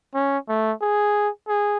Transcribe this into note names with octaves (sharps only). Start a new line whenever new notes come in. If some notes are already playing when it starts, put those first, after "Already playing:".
C#4
A3
G#4
G#4